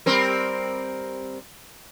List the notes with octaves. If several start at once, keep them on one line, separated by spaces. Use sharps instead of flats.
G3 C4 A#4